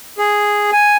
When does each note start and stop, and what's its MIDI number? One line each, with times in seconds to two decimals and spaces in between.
0.18 0.71 68
0.73 0.97 80